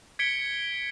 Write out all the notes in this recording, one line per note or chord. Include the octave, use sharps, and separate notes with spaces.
G#6 B6 C#7 D7 G7